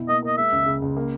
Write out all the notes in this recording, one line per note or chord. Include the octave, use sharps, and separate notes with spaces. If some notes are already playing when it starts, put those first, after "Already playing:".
Already playing: B2 E4
A#3 D#5
A#4 D#5
G#3 E5
C#2
C#3
C#2
A#3